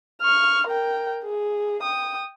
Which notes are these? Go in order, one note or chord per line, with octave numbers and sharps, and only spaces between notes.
C#6 F6
A#4 G5
G#4
G5 D#6